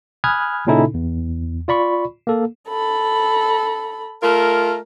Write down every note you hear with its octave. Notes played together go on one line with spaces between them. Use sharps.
G#5 B5 D#6 F6 F#6 G#6
A#2 C#3 C#4 D#4 E4 A4
E2
F4 D5 B5 C#6
A#3 A4
A4 B5
A3 F4 A#4